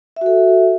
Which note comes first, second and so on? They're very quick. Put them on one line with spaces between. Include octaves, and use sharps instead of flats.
E5 F#4 A4